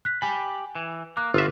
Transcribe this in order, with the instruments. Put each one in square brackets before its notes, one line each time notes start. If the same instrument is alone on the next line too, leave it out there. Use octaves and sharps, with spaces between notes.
[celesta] F#6 B6
[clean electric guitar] G4 B5 [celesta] G#5
[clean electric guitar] E3
[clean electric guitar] A#3 [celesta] D6 F#6
[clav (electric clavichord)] G1 E5 [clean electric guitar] F4 F#4